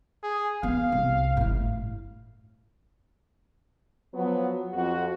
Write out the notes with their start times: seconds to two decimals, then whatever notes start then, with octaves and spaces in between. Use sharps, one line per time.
0.23 G#4
0.63 B3 F5
0.92 C2
1.37 G1 A2
4.14 F3 F#3 B3
4.73 F2 F#4